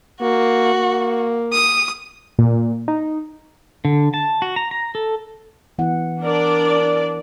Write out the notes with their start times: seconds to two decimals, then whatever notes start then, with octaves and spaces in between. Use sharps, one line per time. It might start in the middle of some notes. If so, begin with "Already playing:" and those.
0.21 A#3 F#4
0.74 A#3
1.52 D#6
2.39 A#2
2.88 D#4
3.85 D3
4.14 A5
4.42 F#4
4.56 A#5
4.71 A#5
4.95 A4
5.79 E3 B3 F#5
6.23 D4 A#4 D5